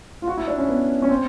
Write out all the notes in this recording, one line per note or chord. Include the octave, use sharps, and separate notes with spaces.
F4
F#4
E4
D4
C#4
B3
C#4
C4